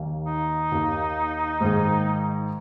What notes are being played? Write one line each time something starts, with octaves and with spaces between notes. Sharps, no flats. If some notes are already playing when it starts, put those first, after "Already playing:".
Already playing: D#2 D#3 A#3
D#4
D#2 D#3 A#3
G#2 D#3 A#3 G#4